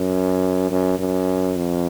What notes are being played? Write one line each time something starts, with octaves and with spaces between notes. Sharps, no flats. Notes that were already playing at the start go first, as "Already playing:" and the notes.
Already playing: F#2
F#2
F#2
F2